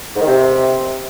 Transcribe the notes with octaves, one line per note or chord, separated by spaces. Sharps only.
G#2
D#3
C3